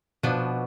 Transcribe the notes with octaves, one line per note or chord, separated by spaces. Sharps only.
B2 F3 B3 D4